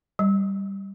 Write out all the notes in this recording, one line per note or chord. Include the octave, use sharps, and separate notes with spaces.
G3